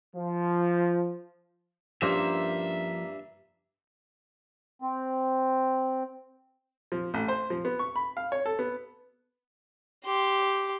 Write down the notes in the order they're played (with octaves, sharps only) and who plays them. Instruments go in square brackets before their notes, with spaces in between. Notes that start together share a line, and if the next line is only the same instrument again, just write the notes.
[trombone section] F3
[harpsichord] G2 [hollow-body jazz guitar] F3 C#4 D4 [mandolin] A#3 C5 G6 [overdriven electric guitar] E5
[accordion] C4
[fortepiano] F3
A1
C5
F3
B3
C#6
B5
F5
C#5
A4
B3
[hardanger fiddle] G4 C6